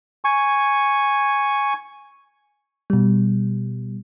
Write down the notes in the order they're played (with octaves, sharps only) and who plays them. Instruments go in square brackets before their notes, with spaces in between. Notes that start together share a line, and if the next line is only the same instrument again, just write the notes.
[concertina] G#5 C#6
[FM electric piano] B2 G3